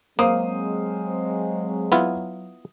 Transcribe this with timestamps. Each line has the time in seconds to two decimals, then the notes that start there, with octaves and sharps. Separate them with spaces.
0.19 F#3 G#3 A#3 C4 C5 F5 D#6
1.92 B3 E4 F4